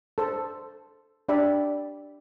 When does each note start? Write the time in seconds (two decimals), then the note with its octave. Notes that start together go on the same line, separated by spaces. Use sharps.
0.18 A4 C5
1.29 D4 G4 D5 E5 B5